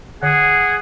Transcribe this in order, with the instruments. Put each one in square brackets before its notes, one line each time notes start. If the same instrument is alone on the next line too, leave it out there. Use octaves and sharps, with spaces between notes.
[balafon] D3 [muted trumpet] G#4 [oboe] F#5